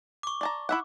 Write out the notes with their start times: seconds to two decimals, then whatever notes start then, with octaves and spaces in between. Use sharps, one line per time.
0.23 C#6 D6
0.41 D5 A5 A#5
0.69 E4 E5 F#5